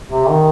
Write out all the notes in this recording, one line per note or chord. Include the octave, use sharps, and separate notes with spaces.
C3
D#3